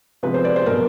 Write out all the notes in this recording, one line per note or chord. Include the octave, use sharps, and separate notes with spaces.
C3 F3 G#3 B3 B4
C5
D5
C5
B2 F#3 B3 A#4